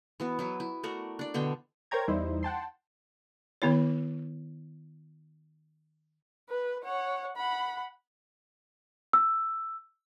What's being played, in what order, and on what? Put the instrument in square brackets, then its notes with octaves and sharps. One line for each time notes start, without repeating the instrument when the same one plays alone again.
[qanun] E3 B3 F#4
F#3 E4 B4
E4
A3 F#4 A#4 D5
D4 D5
B2 D3 B3 G5
[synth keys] A#4 C5 C#5 G5 A#5 G#6
E2 G3 D#4 E4 C5
F#5 G5 A5 C6
[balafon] D#3 B3 E4 C#5
[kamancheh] B4
C#5 F#5
F#5 B5
[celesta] E6